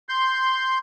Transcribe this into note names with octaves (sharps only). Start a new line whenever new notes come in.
C6 G6